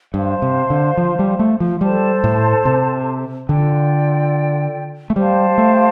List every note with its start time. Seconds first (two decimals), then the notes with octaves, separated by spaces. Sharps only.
0.14 G2 C5 F5 A5 C6
0.42 C3
0.70 D3
0.97 F3
1.19 G3
1.39 A3
1.60 F3
1.81 G3 A4 C5 A5
2.24 A2
2.65 C3
3.49 D3 F4 A4 D5 G5
5.10 A3
5.16 G3 G4 C5 F5 A5
5.58 A3